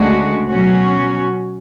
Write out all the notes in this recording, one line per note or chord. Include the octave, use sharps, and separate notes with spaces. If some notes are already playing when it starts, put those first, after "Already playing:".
Already playing: D2 C#3 G#3 D4 F#4
B2 F#3 C#4 F#4